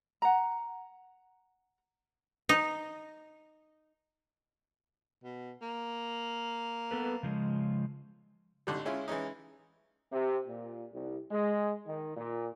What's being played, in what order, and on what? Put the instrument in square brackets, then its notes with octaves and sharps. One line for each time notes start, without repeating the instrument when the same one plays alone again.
[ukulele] F#5 A#5
[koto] D#4
[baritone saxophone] B2
A#3
[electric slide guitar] B3 A4 B4
C#3 F3 G#3
[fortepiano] G#1 D3 G3
G#3 C#4 E4 F4
E3 G#3 C#4 D#4
[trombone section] C3
A#2
C2
G#3
D#3
A#2